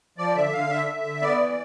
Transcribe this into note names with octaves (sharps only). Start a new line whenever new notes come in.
F3 D5
D3 E5
D3 F5
D3 E5
D3
D3
B3 D5
E3